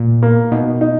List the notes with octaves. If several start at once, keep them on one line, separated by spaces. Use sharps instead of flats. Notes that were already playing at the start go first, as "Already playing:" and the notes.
Already playing: A#2
A#3
B2 D#4
D#4